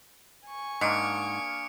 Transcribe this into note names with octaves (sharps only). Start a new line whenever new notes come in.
G#5 C#6
G#2 A#3 D4 F5 D#6 C#7 D7